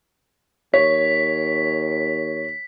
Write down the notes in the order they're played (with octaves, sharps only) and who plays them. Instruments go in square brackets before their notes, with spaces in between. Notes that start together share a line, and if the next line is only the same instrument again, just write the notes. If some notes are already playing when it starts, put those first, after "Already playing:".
[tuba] D#2 [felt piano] C#5 [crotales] B6